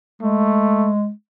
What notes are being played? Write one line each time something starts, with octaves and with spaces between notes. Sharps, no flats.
G#3 A3